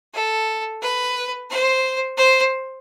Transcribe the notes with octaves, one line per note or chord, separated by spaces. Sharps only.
A4
B4
C5
C5